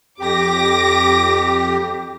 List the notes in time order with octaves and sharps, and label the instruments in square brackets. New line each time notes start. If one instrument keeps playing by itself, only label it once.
[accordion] F2 G4 [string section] D6 A#6